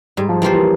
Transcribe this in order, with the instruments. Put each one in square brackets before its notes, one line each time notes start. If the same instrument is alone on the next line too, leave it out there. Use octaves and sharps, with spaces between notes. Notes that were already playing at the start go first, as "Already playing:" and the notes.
[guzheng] G#2 [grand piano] G3
[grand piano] F3
[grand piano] E3 [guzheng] G3 A#3 F4 C5
[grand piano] E3